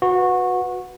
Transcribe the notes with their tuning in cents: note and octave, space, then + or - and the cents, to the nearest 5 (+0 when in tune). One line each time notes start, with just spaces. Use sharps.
F#4 -20 B4 +0